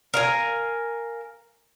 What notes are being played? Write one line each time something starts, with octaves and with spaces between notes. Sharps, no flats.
A#4 F5 G#5